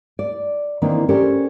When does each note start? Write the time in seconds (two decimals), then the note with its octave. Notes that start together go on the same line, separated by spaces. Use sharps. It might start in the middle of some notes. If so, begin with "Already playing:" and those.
0.19 D5
0.82 D#3 E3 A#3 C4 D4
1.09 C#4 G4 A4 A#4 C5 D5